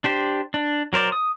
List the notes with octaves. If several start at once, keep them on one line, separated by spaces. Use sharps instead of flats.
D4 G4 C5
D4
F#3 A#4 C5 D5
D#6